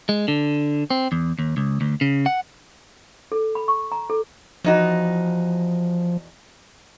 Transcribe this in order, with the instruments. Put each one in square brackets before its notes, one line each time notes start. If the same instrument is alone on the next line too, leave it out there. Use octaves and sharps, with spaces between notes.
[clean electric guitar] G#3
D3
C4
E2
D#2
C#2
D2
C#3
F#5
[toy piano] A4
B5
C#6
A#5
A4
[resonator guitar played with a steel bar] E2 D#4 F#4 [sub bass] F3